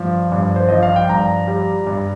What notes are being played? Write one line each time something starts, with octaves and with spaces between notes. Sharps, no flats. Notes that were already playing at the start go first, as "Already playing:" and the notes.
Already playing: G2 F3
G2
C5
F3 D#5
F5
G5
G2 A#5
G3
G2